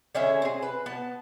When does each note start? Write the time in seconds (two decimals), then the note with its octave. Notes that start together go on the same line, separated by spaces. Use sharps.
0.15 D3 C#4 G#4 E5
0.42 C4 G#4
0.62 B4
0.86 B3 A5